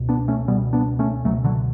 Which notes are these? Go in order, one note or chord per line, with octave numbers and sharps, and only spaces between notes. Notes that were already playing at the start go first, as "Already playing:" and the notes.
Already playing: C#2 B2
B3 D4
A3 C#4
C#2 B2 G3 B3
B3 D4
A3 C#4
C#2 B2 F#3 A3
D3 F#3